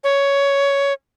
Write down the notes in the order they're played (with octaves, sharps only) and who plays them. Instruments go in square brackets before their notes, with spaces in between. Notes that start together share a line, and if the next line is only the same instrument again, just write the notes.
[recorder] C#5